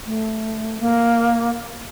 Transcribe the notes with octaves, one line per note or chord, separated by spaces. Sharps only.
A3
A#3